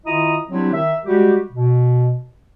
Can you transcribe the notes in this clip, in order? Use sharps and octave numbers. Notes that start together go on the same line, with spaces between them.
D#3 E4 F4 D#5 A#5 D#6
F#3 G3 C4 D4 E4 G4
D#3 E5
G3 G#3 F#4 G4
B2